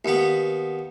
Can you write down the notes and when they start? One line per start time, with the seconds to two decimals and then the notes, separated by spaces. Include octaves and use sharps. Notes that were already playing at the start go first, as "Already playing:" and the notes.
0.05 D#2 B3